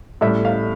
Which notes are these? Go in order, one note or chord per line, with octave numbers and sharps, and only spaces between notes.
A2 G3 E5
F5